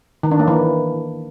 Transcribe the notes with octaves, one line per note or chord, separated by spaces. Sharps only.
D#3
D4
A#3
E3